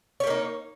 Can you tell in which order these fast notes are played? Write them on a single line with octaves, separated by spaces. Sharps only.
C#5 G4 A#3 D#4